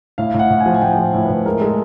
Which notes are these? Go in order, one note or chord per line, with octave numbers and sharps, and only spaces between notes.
A2 F5
A2
F#5
A2
G#5
F3
G#5
A2 G5
F3
A2
B4
A2
G#3 A#4
G#3 A4